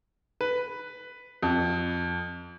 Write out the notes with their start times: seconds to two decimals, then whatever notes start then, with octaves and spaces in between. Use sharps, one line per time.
0.41 B4
1.42 F2